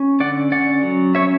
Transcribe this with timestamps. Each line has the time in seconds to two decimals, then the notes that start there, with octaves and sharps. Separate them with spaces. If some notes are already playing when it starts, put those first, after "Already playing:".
Already playing: C#4
0.20 D3 D5 F#5
0.52 C#4 D5 F#5
0.83 F#3
1.15 C#4 C#5 E5